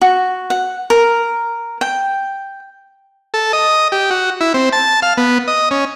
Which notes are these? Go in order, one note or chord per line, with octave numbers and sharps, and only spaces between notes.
F#4
F#5
A#4
G5
A4
D#5
G4
F#4
E4
C4
A5
F5
B3
D#5
C#4